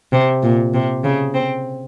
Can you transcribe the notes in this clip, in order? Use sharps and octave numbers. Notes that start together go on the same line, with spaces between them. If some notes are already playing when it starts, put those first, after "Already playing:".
C3
A#2
C3
C#3
C4